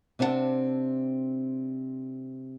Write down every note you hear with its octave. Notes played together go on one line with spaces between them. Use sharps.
C3 C4 D4 E4 F#5 A5